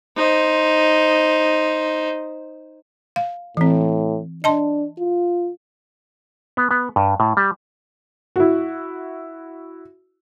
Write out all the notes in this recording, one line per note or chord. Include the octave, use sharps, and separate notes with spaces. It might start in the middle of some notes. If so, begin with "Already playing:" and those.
D#4 C5
F5
A2 E3 C4
D4 D#5 A5 C6
F4
B3
B3
G2
A2
G3
E4 F#4